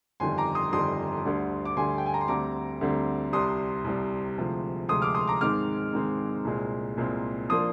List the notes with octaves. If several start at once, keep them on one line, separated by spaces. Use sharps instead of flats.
G1 F2 D#3 G3 G#5 C6
A#5 D6
C6 D#6
G1 F2 D#3 G3 C6 D#6
D2 D3 G3
D6
D2 D3 G3 G#5 C6
G5
G#5
A#5
C6
D2 D3 G3 C4 A#5 D6
D2 D3 G3 C4
C2 C3 G3 C6 D#6
C2 C3 G3
D2 C3 F3 G#3
D2 C3 F3 G#3 C6 D#6
D6 F6
C6 D#6
A#5 D6
G#2 D#3 G#3 C4 D6 F6
G#2 D#3 G#3 C4
C2 A#2 G#3 C4
C2 A#2 G#3 C4
F3 A#3 D4 C6 D#6